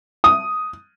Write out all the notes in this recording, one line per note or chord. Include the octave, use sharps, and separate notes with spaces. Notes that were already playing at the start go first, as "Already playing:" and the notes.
D#6